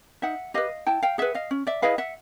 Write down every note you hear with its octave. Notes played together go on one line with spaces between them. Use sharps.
D#4 E5 F#5
G4 B4 D#5 F5
E4 G5 A5
F5 G5
G#4 B4 E5 F#5
D#5 F5
C#4
D5 E5
E4 G#4 B4 D#5 F5
E5 F#5